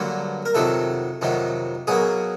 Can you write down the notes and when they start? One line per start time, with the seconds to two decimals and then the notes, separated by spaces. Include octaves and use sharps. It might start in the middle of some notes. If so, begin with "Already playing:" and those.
Already playing: G2 D3 F#3 A#3
0.46 A#4
0.54 F2 C3 D#3 F#3 A4
1.21 F2 C3 D#3 F#3
1.87 B2 F#3 A#3 G#4